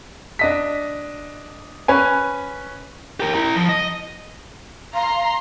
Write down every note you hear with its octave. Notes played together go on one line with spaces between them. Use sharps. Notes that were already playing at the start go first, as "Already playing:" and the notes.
D4 D#5 B6
C#4 B4 G#5
G4 A#4
E4 A#5
F3
D#5
F5 A#5 C6